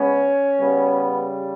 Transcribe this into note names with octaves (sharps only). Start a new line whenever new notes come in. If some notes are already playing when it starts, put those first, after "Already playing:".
Already playing: C#3 G#3 B3 C#4
C#3 G3 B3